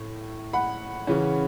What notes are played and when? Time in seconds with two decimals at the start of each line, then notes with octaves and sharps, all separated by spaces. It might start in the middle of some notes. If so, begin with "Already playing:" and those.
Already playing: A2
0.53 F#5 B5
1.07 C#3 E3 C#4